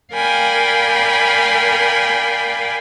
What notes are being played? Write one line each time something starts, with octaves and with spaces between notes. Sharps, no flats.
A#4 D5 F5 G5 G#5 B5